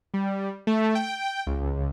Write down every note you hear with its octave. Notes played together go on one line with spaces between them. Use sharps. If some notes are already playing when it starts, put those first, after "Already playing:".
G3
A3
G5
C#2